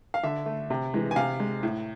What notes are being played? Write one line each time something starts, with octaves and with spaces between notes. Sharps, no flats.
F5
D3 E5
A3
C3
E3 G#3
G#5
C3 F5
G#3
A2